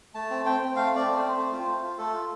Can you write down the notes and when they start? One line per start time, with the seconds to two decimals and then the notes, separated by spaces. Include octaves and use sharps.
0.14 A3 A5
0.30 C4
0.45 C4 G5
0.60 C4
0.76 A3 F5
0.91 C4 D5
1.07 A3
1.17 C5
1.22 C4
1.37 A3
1.52 F4
1.67 A3
1.83 F4
1.98 A3 A4
2.14 F4